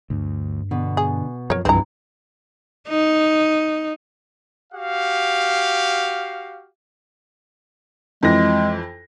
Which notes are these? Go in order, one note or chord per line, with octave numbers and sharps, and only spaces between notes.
D2 G2
B2 D3
G#4
F#2 F3 A#4 C#5
C2 G2 C3 E3 C4 A#5
D#4
F#4 G4 F5
F2 E3 G#3 A#6